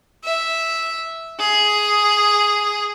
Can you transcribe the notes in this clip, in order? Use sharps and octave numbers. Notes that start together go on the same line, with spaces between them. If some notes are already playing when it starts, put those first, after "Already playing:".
E5
G#4